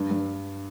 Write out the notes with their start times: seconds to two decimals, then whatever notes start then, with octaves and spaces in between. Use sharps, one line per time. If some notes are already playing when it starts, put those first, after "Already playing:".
Already playing: G2
0.11 G2